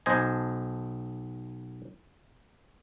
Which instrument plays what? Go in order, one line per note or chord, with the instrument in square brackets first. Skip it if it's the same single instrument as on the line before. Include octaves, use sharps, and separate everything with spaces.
[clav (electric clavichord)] B1 C5 D#5 G#5